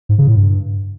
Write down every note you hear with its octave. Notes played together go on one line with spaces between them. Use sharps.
G#2
C#3
A2
G2